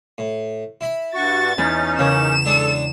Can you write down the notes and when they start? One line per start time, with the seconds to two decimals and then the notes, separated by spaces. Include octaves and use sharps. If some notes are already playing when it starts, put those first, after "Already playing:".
0.18 A2
0.81 E4 B5
1.15 G2 F#4 C#6 A6
1.58 E2 C#4 D#4 G#5
1.99 C#3 A#3 C#5 E7
2.45 G#3 D4 D#4 A4